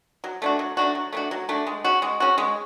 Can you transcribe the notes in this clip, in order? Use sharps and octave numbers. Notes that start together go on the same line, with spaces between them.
F#3
A3 D4 F#4
F#3
A3 D4 F#4
F#3
A3 D4 F#4
F#3
A3 D4 F#4
G#3
C#4 F#4
G#3
C#4 F#4
G#3